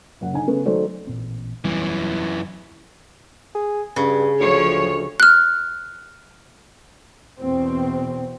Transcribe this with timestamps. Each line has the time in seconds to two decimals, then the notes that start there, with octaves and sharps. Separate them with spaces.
0.21 F#1 F#5
0.33 D3 D#4 G#5
0.47 C#3 A3 B3 C#4
0.65 D#3 F#3 A3 C5 D5
1.07 A1 A#2 C4
1.65 E1 F#2 E3 G3 B3
3.55 G#4
3.96 G2 C#3
4.40 D2 F3 C#5
5.20 F6 F#6
7.40 E2 B2 C4